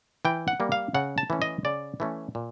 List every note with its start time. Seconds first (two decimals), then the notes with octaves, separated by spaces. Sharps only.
0.25 E3 G5
0.48 F#5
0.60 G3 A#3
0.72 F5
0.94 C#3 F#5
1.18 A5
1.30 E3 A3 C#4
1.42 D#5
1.65 C#3 D5
2.00 E3 A3 C#4
2.35 A#2